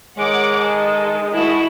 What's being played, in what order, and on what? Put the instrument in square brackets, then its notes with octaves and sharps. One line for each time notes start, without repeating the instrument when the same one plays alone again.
[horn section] D#3 G#3 [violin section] C#5 F#5 D6
[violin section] A4
A3 E4 F#4